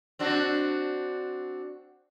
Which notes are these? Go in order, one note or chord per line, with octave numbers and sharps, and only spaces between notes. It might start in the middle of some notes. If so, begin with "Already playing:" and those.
C4 D4 F#4